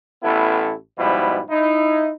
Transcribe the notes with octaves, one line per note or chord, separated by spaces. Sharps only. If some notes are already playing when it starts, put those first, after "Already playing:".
A1 B3 E4 A4
G#2 B2 F3 G3 E4
D#4 E4